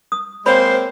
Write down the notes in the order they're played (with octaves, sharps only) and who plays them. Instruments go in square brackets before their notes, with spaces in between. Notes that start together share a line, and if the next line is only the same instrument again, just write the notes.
[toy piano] D#6
[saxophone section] G#3 A#3 C4 [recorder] C5 [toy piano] C#5 B5